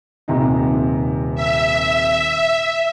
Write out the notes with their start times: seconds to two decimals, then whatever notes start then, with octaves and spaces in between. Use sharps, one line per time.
0.28 D#1 C3 D#4
1.35 E5